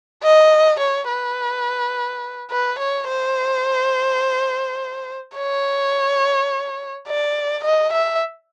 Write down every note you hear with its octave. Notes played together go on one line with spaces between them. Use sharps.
D#5
C#5
B4
B4
C#5
C5
C#5
D5
D#5
E5